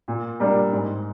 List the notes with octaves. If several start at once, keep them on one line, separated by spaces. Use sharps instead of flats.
A#2
G3 A#3 D4
G#2